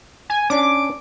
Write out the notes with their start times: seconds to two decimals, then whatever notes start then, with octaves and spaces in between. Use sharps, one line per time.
0.30 G#5
0.50 C#4 D4 D6